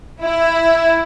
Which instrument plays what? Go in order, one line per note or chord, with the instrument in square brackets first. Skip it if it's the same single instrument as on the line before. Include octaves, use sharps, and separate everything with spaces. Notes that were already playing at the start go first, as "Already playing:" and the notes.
[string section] E4